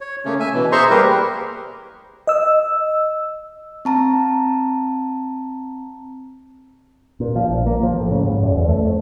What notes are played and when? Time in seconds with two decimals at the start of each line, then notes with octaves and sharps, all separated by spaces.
0.01 C#5
0.25 C#3 A3 A#3 C#4
0.40 E5 G#5
0.54 B2 E3
0.72 G#4 C5 E5 A#5 C6 C#6
0.90 G3 A#3 G4 A#4 B4
2.27 D#5 E6
3.85 C4 A5 A#5
7.20 A#2
7.36 F3
7.49 A#1
7.66 A#3
7.83 F3
8.00 A2
8.12 C#3
8.24 G#2
8.43 F#2
8.56 E2
8.68 A3
8.85 F2